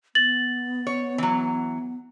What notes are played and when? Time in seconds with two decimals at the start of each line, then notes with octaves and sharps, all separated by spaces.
0.15 B3 A6 F#7
0.87 C#5
1.18 E3 F#3